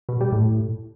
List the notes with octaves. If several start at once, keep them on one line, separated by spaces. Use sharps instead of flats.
B2
G3
A2